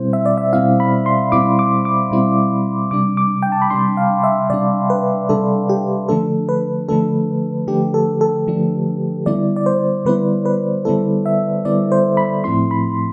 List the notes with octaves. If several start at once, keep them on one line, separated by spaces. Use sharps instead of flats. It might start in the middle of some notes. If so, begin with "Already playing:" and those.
Already playing: B2 G3 C4 E4 C5
E5
D5
E5
B2 G3 C4 E4 F5
B5
C6
B2 G3 C4 E4 D6
D6
D6
B2 G3 C4 E4
C3 G3 D4 D6
D6
G5
A5
B5
C3 G3 D4 C6
F5
E5
C3 G3 D4 D5
B4
C3 G3 D4 A4
G4
D3 F3 A3 D4 A4
B4
D3 F3 A3 D4 A4
D3 F3 A3 D4 G4
A4
A4
D3 F3 A3 D4
D3 G3 B3 E4 D5
D5
C5
D3 G3 B3 E4 B4
B4
D3 G3 B3 E4 A4
E5
D3 G3 B3 E4 D5
C5
B5
A2 F3 A3 C4 E4 C6
B5